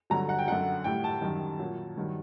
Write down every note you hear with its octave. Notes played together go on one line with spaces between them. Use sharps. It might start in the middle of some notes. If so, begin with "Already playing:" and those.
G2 D3 F#3 A#5
F#5
G5
F#2 D3 F#3 F#5
A2 G3 G5
A5
F#2 D#3 G3
A#2 F#3
G2 D#3 F#3